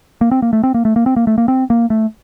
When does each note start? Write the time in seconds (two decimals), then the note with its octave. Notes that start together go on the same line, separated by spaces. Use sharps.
0.21 A#3
0.31 C4
0.42 A#3
0.53 A3
0.63 C4
0.74 A#3
0.85 A3
0.96 A#3
1.06 C4
1.16 A#3
1.27 A3
1.38 A#3
1.48 C4
1.70 A#3
1.90 A3